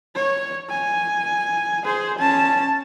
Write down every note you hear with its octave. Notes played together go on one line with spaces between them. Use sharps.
C#5
G#5
G#4 C5
C#4 A5